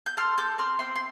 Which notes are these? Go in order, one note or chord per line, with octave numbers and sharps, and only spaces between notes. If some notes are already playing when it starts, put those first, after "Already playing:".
G6
A4 C6 F6
A4 D6 G6
C4 C6 F6
C4 G5 C6
C6